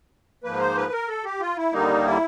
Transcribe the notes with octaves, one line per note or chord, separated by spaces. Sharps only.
G#2 F3 A#3 B4
C5
B4
A#4
A4
G4
F4
E4
D#2 D3 G3 A#3 D#4
E4